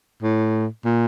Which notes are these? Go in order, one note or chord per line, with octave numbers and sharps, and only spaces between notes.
A2
A#2